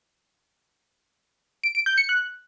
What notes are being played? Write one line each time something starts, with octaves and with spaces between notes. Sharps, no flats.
D7
D7
G6
C#7
F#6